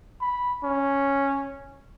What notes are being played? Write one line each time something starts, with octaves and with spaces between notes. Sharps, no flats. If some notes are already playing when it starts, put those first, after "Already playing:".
B5
C#4